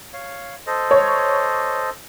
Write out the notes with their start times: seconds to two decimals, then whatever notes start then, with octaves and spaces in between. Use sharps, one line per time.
0.13 C#5 F5
0.67 A4 C5 D#5
0.91 C#5